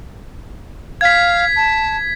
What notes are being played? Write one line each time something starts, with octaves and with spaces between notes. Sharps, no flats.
F5 G#6 B6
A5